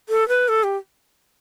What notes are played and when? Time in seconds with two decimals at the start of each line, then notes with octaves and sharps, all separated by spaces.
0.09 A4
0.28 B4
0.48 A4
0.63 G4